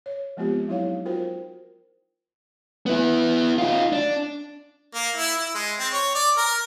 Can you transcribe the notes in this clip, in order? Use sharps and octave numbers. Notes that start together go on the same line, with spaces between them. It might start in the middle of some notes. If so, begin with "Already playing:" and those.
C#5
F3 G#3 B3 C4 F4 G4
F#3 D#4 E4 C#5 F5
F4 F#4 A#4 C5 G5
B3 E4
D#4 F4
D4
A#3
E4
E4
G#3
C4
C#5
D5
A#4